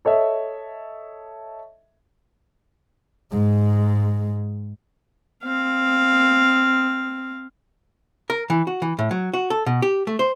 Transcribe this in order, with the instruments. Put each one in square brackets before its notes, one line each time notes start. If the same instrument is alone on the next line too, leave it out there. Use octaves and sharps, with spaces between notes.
[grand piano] A4 C#5 D#5 E5
[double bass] G#2 G#3
[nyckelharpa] C4 F5
[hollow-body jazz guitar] A#4
E3
F#4
E3
A2
F#3
F#4
A4
B2
G4
A3
C5